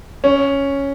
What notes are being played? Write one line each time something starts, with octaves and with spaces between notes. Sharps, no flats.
C#4